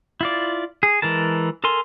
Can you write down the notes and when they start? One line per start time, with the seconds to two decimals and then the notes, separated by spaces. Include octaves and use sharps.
0.21 E4 F4 D5
0.83 G#4
1.02 E3 G#3 A#4 A5
1.64 A4 A#4 G#5 C6